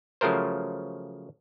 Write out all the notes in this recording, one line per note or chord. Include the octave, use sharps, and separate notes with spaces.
C#3 F3 F#3 A3 A#4 C5